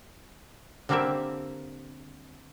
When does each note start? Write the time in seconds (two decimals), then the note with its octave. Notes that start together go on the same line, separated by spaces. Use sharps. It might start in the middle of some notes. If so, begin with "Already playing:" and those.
0.89 D3 G3 A#3 C4 G4 E5